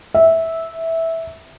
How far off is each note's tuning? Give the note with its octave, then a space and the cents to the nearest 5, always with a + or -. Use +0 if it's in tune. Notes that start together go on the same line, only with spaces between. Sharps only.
E5 -10